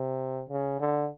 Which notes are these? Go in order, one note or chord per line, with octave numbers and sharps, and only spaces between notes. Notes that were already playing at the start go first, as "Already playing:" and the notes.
Already playing: C3
C#3
D3